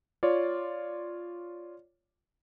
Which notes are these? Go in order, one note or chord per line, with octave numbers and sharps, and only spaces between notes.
F4 C#5 D5